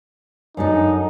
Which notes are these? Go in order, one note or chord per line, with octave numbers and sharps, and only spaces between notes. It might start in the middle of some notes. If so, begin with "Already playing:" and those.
F#2 D4 D#4 A4